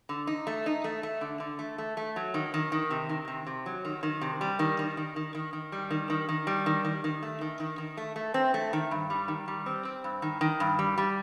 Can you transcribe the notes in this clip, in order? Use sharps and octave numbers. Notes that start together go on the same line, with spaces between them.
D3
D#4
A3
D#4
A3
A3
D3
D3
A3
A3
A3
F#3
D#3
D#3
D#3
C3
D#3
C3
C3
F#3
D#3
D#3
C3
G3
D#3
D#3
D#3
D#3
D#3
D#3
G3
D#3
D#3
D#3
G3
D#3
D#3
D#3
A3
D#3
D#3
D#3
A3
A3
C4
A3
D#3
G2
G3
D#3
G3
C4
C4
G2
D#3
D#3
G2
G3
G3